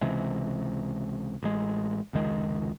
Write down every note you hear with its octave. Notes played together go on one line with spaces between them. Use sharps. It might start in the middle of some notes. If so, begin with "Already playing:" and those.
C#2 C3 E3 G#3
A1 G#3
F1 C#2 D#3 G#3